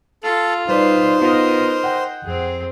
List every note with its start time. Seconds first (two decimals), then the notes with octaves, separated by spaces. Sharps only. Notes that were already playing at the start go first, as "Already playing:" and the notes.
0.23 F4 A4
0.68 G3 D#4 B4 C5 D5
1.22 B3 F4 A#4 B4 D#5
1.84 F#5 G5
2.24 F2 C4 G#4